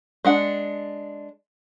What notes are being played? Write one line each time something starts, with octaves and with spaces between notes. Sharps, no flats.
G#3 D4 F#5